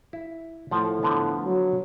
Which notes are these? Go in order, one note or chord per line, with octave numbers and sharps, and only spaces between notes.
E4
A2 F3 F#5 A5
D3 F3 B3
F#3